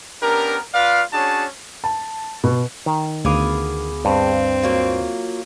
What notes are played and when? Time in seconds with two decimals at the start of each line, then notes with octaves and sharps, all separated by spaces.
0.22 B3 C#4 D4 G4 A#4
0.74 F4 B4 D5 F5
1.13 C#4 D4 F#4 G#4 C#5 A5
1.84 A5
2.44 B2
2.86 D#3
3.25 D2 B3 G#4 F5 D6
4.05 G2 C4
4.62 F#3 A#3 F4